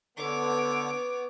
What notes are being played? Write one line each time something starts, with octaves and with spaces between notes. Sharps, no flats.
D3 B3 C#5 D6